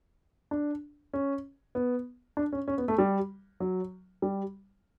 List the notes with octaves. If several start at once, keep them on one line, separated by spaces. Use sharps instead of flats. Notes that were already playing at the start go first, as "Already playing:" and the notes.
D4
C#4
B3
D4
C#4
C#4
B3
A3
G3
F#3
G3